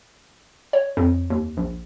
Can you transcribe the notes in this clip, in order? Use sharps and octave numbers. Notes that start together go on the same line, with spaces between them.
C#5
F2
D#2
A#1